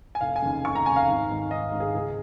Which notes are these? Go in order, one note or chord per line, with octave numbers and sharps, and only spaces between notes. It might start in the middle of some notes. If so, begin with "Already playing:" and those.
G#5
F1 F5
G#5
D#2 C#3
F1 C#6
A#5
D#2 C#3 G#5
F5
G#1
G#2 D#3
G#1 D#5
G#2 D#3
G#4
C#2 G#4